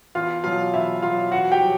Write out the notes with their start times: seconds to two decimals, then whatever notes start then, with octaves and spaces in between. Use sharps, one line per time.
0.15 E2 F4 F5
0.44 B2 F#3 F4 F5
0.74 E2 E4 E5
1.02 B2 F#3 F4 F5
1.31 E2 F#4 F#5
1.52 G4 G5
1.61 B2 F#3